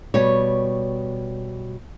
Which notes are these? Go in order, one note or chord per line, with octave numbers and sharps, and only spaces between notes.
B2 G3 C#5